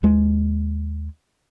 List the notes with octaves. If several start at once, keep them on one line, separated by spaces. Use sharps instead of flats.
D#2 G#3